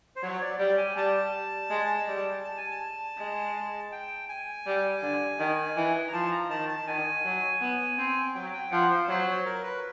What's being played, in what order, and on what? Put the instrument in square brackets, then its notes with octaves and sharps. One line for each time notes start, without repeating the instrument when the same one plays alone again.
[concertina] C5
[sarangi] F#3 [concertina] C#5
[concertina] D5
[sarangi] G3 [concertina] D5
[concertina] G#5
[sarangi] G3 [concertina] A5
[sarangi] G#3
G3
[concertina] A5
G#5
A5
[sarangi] G#3
[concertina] G5
G#5
[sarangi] G3
D3
D#3
E3
[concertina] A#5
[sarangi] F3 [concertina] A5
[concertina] A#5
[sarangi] D#3 [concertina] A5
[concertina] A5
[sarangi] D#3 [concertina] G#5
[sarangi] F#3
B3
C4
[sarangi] F#3 [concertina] G5
[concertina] G5
[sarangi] F3 [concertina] F#5
[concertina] C5
[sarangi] F#3 [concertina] C5
[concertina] C#5
A#4
B4